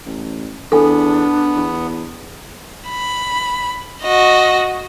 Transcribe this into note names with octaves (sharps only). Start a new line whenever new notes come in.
A1
E2 B3 D4 A4 G#5
E2
B5
F#4 D#5